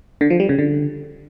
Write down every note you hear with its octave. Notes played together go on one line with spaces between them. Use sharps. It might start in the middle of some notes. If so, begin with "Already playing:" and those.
D3
F3
G3
C#3
D3